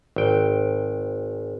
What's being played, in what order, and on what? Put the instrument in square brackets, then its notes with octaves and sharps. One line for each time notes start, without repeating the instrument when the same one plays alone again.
[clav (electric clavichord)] G#1 G5